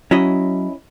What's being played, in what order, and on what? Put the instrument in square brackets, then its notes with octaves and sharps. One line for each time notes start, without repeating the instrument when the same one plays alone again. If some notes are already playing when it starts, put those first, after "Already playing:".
[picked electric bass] F#3 [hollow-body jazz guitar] C#4 E4 D#5